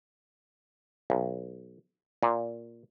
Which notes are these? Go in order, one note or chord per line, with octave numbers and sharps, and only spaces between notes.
B1
A#2